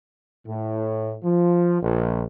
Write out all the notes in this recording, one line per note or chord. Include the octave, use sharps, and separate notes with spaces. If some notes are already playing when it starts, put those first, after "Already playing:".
A2
F3
A#1